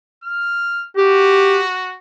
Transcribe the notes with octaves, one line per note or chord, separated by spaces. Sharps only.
F6
F#4 G4